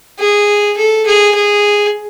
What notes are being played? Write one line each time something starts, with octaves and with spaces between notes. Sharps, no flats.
G#4
A4
G#4
G#4